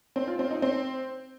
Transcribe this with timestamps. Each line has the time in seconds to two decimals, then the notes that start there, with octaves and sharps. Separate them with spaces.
0.16 C4
0.27 F4
0.39 C4
0.51 D#4
0.62 C4